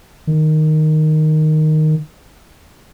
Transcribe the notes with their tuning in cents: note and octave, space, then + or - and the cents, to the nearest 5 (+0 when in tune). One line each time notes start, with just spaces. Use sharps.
D#3 -5